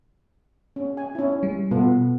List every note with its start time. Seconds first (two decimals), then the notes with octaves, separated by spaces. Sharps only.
0.76 C#4
0.97 G#5
1.15 C#4 E4
1.43 G3
1.71 B2 B3 F4 A4